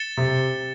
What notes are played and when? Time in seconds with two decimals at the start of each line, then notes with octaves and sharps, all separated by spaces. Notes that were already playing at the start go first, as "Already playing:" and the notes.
Already playing: A6 C#7 E7 G7
0.17 C3